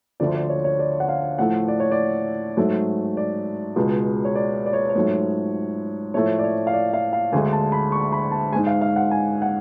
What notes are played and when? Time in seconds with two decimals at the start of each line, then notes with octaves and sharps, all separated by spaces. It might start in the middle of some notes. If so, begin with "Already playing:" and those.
0.20 D2 D3 F3 D5
0.34 D5
0.50 C#5
0.64 C#5
0.79 D5
1.00 F#5
1.09 F5
1.39 A2 F3 A3 F#5
1.68 D5
1.80 C#5
1.91 D5
2.57 G#2 F#3 A3
3.17 D5
3.76 C#2 B2 G#3
4.25 C#5
4.35 D5
4.66 D5
4.73 C#5
4.89 C#5
4.95 G#2 F#3 A3
6.14 A2 F3 A3 C#5
6.39 D5
6.44 C#5
6.67 F5
6.73 D5
6.93 F5
7.13 F5
7.32 D2 D3 G#3 G#5
7.53 A5
7.72 B5
7.92 C#6
8.12 B5
8.32 A5
8.52 G#3 G#5
8.56 G#2
8.67 F5
8.81 F5
8.96 F#5
9.11 G#5
9.42 F#5